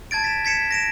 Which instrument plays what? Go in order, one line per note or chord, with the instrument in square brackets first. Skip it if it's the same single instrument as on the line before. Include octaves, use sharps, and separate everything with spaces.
[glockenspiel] A5 G#6 A6 D7
B6 E7
G#6 B6 C#7 E7
A#6 D7 E7